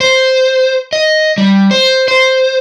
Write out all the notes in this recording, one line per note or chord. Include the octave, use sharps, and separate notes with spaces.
C5
D#5
G3
C5
C5